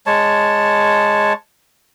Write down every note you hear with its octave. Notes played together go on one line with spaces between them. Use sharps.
G#3 C#5 A5